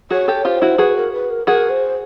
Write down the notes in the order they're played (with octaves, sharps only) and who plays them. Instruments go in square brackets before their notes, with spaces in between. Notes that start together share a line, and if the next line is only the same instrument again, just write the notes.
[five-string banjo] F#4 G#4 [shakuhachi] C#5
[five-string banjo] G4 A4
[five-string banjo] F4 G4 [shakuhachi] C5
[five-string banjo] E4 F#4
[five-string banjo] F#4 G#4 [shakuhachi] B4
[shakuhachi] A#4
B4
A#4
[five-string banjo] F#4 G#4 [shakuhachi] A#4
[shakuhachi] C5